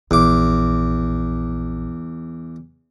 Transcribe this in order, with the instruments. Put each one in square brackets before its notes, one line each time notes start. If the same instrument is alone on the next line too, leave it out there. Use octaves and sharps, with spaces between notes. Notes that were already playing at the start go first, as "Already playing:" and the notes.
[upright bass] A#1 [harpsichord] E2 D6